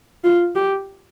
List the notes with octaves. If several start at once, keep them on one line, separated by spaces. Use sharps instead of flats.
F4
G4